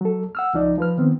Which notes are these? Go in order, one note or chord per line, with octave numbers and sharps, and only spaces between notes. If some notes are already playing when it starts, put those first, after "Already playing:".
F#3 A4
F#5 E6 F6
C#2 F3 D#4 D5
F3 B4 F6
D#3 B3 C4